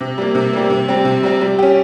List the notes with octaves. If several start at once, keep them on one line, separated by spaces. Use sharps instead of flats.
C3
G3 A#3
C3
G3 A#3
C3
G3 C4
C3
G3 C4
G3
C#4 G4